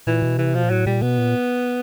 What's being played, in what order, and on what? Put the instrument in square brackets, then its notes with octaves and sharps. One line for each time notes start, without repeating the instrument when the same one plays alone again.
[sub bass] A#2 [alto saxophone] E3
[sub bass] B2
[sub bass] C3 [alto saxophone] E3
[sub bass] B2 [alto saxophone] F3
[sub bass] A#2
[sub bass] A2 [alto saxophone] F#3
[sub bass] A#2 [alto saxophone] G3
[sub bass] B2 [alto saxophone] B3
[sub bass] A#2